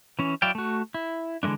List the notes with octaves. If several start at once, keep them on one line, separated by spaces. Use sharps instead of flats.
E3 C#4
F#3 E4 D5 F5 G5
A3 F#4
E4
D3 E3 G#3 A3 D4